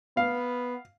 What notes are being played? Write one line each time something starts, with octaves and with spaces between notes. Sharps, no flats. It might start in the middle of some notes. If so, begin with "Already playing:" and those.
B3 F5